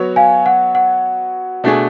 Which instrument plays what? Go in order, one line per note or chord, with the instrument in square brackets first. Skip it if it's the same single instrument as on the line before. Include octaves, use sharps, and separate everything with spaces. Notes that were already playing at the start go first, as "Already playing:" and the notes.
Already playing: [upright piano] F#3 B3 F#4 C#5
[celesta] F5 G#5
F#5
F#5
[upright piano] B2 A3 D4 G#4